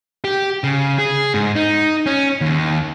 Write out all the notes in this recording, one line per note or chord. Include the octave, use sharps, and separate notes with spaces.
G4
C#3
G#4
G#2
D#4
C#4
D#2